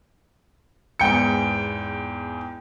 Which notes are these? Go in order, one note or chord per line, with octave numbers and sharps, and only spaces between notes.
E2 G#2 G5 C#7